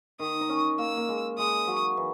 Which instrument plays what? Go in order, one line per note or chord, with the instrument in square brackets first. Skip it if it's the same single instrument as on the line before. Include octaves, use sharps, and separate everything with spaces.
[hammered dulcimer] D#3 [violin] D#6
[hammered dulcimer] D#4
C#4
[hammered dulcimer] A#3 [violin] E6
[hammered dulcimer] A#3
G#3
[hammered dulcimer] G#3 [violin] D#6
[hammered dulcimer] F#3
E3